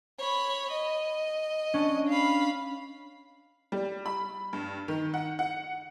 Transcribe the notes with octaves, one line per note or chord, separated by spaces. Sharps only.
C#5 B5
D#5
C#4 D4
F5 B5
G3
B5
G2
D#3
F#5
F#5